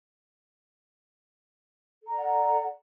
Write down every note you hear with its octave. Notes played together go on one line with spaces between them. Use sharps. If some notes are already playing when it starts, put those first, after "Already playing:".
A4 D5 F#5 A#5